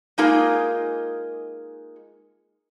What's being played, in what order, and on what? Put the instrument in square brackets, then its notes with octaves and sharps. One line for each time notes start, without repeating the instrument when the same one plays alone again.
[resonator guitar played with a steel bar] G#3 A#3 D#4 F4 G#4 A#4